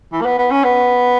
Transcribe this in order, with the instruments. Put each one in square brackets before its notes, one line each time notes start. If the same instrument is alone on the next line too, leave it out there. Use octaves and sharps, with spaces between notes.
[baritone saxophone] E3
A#3
B3
B3
C#4
B3